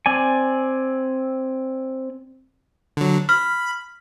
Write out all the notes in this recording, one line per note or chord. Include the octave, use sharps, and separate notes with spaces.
C4 D5 G#5
D3 F#3
B5 F6